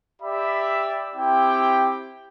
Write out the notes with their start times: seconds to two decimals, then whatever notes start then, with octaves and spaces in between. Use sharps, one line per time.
0.22 G4 D5 E5 B5
1.16 C4 E4 G4 G5